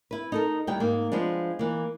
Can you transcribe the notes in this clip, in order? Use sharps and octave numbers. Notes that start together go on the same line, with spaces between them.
E4 B4
D#4 A4 A#4
D#2 D#3 G3 E4 G5
G#2 A#3
F3 G#3 B3 D4
E3 A#3